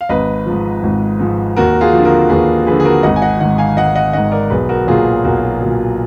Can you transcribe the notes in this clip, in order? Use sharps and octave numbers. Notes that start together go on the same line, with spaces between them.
F5
G#1 B4 D#5
G#2 F3
G#1
G#2 F3
D#2 F#4 A#4
F4 G#4
D3 F3
F#4 A#4
D#2 G#4 B4
D3 F3 G#4 B4
G#4
F#4 A#4
G#1 D#5 F#5
G#5
D#5 F#5
G#2 D#3 D#5 F#5
F5 G#5
G#1 D#5 F#5
D#5 F#5
G#2 D#3 D#5 F#5
A#4 D5
B1 G#4 B4
F#4 A#4
A#2 F#3 F4 G#4
B1 F#4 A#4
A#2 F#3